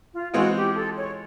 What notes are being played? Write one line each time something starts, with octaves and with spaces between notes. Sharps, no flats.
F4
E3 G#3 C4 F4 F#4
G4
A4
C#5